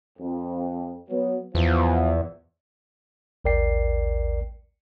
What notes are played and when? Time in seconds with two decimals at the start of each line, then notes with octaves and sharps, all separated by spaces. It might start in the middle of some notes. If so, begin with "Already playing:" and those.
0.19 F2
1.10 F#3 B3
1.55 E2 F3 B3
3.45 A1 D#2 A#4 D5 G5 C7